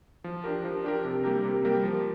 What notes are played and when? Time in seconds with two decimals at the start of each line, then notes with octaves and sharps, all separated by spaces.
0.24 F3
0.44 D4 G4 A#4
0.65 F3
0.84 D4 G4 A#4
1.05 C3
1.24 G3 A#3 G4 A#4
1.45 C3
1.65 G3 A#3 G4 A#4
1.83 F3